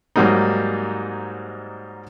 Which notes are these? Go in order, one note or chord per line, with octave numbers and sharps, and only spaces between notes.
G#2 F#3 G3 A#3 D#4